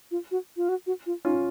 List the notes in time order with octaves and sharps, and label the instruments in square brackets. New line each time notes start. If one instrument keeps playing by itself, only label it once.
[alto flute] F4
F#4
F4
F#4
F#4
F4
[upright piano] C#4 F4 [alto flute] D#4